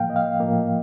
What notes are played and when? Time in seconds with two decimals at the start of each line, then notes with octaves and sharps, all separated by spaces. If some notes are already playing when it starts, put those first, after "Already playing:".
Already playing: A2 F3 A#3 F5 G5
0.10 D#5
0.16 F5
0.40 A2 F3 A#3